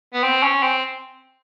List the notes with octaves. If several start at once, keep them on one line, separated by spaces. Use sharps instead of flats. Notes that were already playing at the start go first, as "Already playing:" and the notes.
B3
C4
C#4
C4